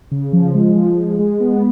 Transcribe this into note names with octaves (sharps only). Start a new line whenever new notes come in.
C#3
F3
G#3
F3
G#3
G#3
B3